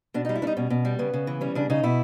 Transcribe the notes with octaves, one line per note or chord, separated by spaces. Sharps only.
B2 D4
G3 D#4
E4
G3 D4 D#4
B2 C#4
B2
G3
C#3 B3
C#3
E3
G3 C#4
C#3 D4
C#3 D#4
B2 E4